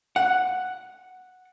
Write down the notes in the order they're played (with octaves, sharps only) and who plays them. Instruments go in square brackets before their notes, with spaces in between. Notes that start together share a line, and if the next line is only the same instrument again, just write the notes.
[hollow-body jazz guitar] F#5